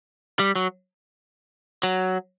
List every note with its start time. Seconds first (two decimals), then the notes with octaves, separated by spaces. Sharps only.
0.40 G3
0.55 F#3
1.83 F#3